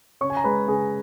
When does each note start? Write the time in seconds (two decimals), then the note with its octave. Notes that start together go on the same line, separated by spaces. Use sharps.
0.21 C#3 C#5 C#6
0.30 G#5
0.37 A#5
0.44 G#3 B4 B5
0.68 C#3 G#4 G#5